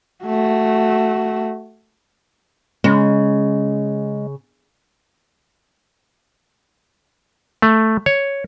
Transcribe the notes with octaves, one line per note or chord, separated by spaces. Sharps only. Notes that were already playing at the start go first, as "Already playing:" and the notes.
A3 F#4
C#3 G#3
A3
C#5